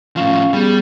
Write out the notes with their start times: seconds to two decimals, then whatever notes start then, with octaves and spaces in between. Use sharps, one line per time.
0.16 A2 F3 C#4 F5
0.53 G3 B3 G#4